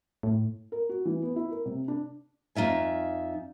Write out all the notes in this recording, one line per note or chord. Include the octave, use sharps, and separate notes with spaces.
A2
A#4
F#4
E3
B3
E4
A#4
C3
D4
F2 D#4 F4 E5 G#5